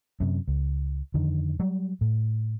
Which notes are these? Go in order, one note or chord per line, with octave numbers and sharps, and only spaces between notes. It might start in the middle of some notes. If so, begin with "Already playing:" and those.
F#2 C3
C#2
F2 D3 D#3
F#3 G3
A2